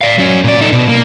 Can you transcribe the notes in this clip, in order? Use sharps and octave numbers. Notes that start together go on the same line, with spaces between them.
D5 F5
F#3 C#4
A#2 D5
D#4 A4
B2
A#3